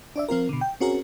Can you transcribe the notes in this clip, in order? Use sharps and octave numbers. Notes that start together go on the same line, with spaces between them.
D4 D5 E5
F3 C4 F4 A#4
B2 D3
G5
C4 C#4 F#4 G#4 A#4